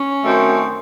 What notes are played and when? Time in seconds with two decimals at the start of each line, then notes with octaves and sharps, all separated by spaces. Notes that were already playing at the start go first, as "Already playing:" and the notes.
Already playing: C#4
0.22 F#2 D#3 A3 C4